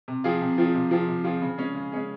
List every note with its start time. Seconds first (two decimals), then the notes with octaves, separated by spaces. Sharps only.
0.08 C3
0.24 F3 C4 F4 G#4
0.41 C3
0.58 F3 C4 F4 G#4
0.74 C3
0.91 F3 C4 F4 G#4
1.08 C3
1.24 F3 C4 F4 G#4
1.42 C#3
1.58 G#3 C#4 G#4
1.75 C#3
1.92 G#3 C#4 G#4